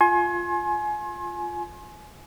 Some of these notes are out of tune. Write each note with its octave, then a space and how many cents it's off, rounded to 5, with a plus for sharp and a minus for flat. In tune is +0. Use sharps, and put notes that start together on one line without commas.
F4 +0 G#5 +25 C6 +35